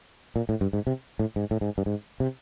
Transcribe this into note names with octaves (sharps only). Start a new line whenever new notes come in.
A#2
A2
G2
G#2
C3
A2
G#2
A2
G#2
G2
G#2
C3